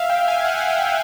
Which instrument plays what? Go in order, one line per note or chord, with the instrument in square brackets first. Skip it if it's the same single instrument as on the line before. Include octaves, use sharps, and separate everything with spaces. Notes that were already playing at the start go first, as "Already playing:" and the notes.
Already playing: [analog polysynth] E5 F5
G5
G#5
F#5
G#5
G5